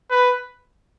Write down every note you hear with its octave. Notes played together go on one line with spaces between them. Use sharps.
B4